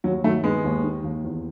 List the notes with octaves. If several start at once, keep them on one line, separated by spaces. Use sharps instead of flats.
D#2 F#3
D#3 F#3 A3
D#3 G#3 B3
D#2
D#3
D#2
E2